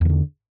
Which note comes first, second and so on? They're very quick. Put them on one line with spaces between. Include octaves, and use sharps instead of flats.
E2 D#3 D3